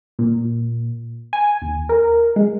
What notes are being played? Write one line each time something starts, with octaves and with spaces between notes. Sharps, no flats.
A#2
G#5
D#2
A#4
G#3